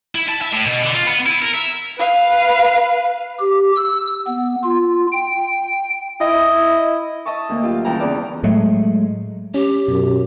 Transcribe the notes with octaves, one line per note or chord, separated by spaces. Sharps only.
E4
A5
E5
A2
B2
D3
F4
B3
E4
A#4
E5
B4 F5
G4
E6
B3
F4
G5
E4 D#5
D#5 E5 A5 C#6
D2 A#3
F#3 F4 G4
C#3 E3 G3 G5 A5 A#5
E2 C#3 E3 D5 F6
A2 F#3 G#3 A3
C#4 G4
F#2 B2